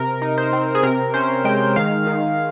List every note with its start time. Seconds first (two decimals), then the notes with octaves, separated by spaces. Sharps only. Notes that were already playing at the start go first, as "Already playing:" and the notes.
Already playing: C3 A#4
0.22 D#4
0.38 C5
0.53 C4
0.75 G#4
0.83 C3 A#4
1.14 C#4 C5
1.44 G#3 G5
1.76 D#3 F5
2.07 D#3